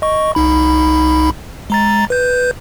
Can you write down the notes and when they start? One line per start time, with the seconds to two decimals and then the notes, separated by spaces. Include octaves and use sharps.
0.02 D#5 C#6
0.35 C2 D#4 B5
1.70 G#3 A#5 A6
2.10 B4 G6